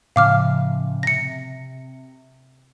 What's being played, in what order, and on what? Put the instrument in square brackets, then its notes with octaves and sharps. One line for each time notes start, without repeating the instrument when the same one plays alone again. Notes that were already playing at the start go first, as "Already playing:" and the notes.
[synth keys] A2 C#3 F3 [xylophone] F5 D6 F6
[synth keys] C3 [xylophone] A#6 C#7